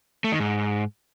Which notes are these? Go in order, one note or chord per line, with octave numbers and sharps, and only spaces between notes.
A3
D#3
G#2